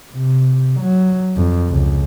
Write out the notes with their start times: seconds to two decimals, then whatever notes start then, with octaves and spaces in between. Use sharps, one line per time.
0.13 C3
0.81 F#3
1.37 F2
1.69 C#2